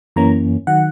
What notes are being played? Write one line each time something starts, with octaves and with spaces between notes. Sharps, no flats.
F#2 E3 A#3 C#4 A#5
D#3 F#3 F#5